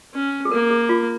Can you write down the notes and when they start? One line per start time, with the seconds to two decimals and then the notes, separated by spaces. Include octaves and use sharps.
0.14 C#4
0.45 G#4
0.51 A#3 A#4
0.70 G#4
0.89 F4